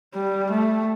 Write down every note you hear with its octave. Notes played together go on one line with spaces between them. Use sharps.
G3
A3